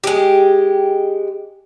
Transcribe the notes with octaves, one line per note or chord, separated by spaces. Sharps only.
G#3 G4